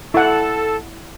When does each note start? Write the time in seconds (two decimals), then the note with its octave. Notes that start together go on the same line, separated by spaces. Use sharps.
0.14 E4 A4 F#5